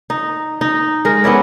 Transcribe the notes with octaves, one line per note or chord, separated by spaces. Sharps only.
D#4
D#4
G#3 A#4
B3 C#4 E4 D5